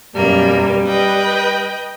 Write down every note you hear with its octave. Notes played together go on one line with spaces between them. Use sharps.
F#2 B2 G3 A#3
B4 D#5 G5